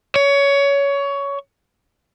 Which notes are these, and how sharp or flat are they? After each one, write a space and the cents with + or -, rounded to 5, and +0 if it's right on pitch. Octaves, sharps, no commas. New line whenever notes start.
C#5 +20